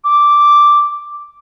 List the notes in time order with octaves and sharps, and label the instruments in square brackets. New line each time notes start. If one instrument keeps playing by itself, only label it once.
[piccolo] D6